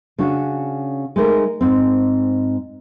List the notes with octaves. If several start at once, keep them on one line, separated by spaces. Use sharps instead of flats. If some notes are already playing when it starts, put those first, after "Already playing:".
C#3 C#4 D4 F#4
G#3 A3 D#4 A#4
G#2 C4